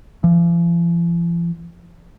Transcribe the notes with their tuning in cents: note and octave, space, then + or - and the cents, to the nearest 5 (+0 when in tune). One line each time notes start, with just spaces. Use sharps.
F3 -45